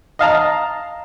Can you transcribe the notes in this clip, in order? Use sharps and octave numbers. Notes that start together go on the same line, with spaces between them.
D#5 F5 A5 A#5